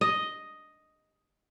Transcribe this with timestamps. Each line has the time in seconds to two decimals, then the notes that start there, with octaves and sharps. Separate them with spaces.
0.01 D#5